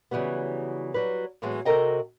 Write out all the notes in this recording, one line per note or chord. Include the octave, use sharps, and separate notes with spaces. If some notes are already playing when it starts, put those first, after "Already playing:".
C#3 E3 F#3 G3 B3
F#3 G3 B4
A2 E3 F#3 G#3 B3
C3 F#4 A4 A#4 D#5 G5